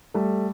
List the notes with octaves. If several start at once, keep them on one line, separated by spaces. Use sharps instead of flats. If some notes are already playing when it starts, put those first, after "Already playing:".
G3 A3